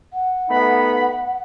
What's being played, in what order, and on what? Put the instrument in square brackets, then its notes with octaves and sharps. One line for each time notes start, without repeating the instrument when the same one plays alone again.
[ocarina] F#5
[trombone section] A3 B3 D#4 [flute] B5